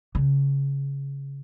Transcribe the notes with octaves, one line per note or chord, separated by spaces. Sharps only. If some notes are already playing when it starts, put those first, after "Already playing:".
C#3